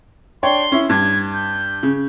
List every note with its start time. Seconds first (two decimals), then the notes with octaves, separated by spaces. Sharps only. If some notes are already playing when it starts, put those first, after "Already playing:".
0.43 D4 C#5 G5 C6
0.72 C#4 E4
0.89 G2 G#6
1.34 G6
1.83 C#3